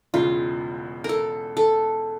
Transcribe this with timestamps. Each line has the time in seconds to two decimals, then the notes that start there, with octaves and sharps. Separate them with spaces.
0.14 E1 E2 C#3 F4
1.04 A4 A#4
1.57 A4